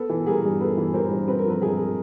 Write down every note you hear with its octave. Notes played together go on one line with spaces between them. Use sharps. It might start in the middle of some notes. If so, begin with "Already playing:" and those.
Already playing: B3 A4 B4
E3
G3 G#4 A#4
G2
B3 A4 B4
E3
G3 A#4 C5
G2
C4 B4
A#4
F3 A4 B4
G#3 G#4 A#4